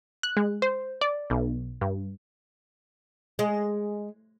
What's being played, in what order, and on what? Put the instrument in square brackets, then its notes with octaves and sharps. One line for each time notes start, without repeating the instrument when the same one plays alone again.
[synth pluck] F#6
G#3
C5
D5
B1
G2
[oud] G#3